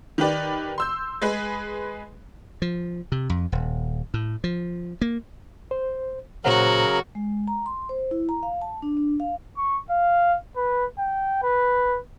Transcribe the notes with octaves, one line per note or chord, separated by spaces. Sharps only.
D#3 G4 B4 D5
C6 E6 G6
G#3 G#4 B4
F3
C3
F2
D#1
A2
F3
A#3
C5
A#2 C#3 F#3 F#4 A#4 C5 F#5
G#3
A#5
C6
C5
E4
A#5
F5
A5
D4
D4
F5
C#6
F5
B4
G5
B4